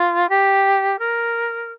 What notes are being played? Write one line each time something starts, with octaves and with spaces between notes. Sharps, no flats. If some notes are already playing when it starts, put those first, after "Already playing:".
Already playing: F4
G4
A#4